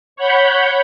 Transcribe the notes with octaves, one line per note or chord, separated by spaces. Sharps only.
C#5 F#5 B5 G6